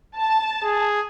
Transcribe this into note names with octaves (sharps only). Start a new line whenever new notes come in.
A5
G#4